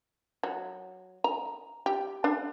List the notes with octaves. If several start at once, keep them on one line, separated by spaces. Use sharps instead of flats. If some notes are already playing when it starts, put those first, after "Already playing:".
F#3
A#5
G4
D4